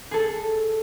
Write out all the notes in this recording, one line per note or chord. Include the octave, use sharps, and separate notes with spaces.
G#4 A4